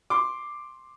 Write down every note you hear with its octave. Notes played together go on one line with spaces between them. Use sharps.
C6 D6